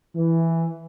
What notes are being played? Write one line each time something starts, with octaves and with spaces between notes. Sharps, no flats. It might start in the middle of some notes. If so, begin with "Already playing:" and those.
E3